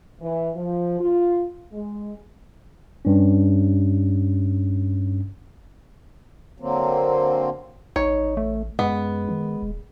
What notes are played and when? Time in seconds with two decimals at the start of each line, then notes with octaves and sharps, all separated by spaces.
0.22 E3
0.56 F3
1.00 F4
1.73 G#3
3.05 G2 C#4
6.60 D3 F#3 A#3 C4
7.96 A1 D#4 C#5
8.37 A3
8.79 F#2 G#3 B3
9.29 D#3
9.63 D#1